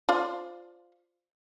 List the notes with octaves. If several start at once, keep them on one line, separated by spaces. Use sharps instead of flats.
F4 C5 D5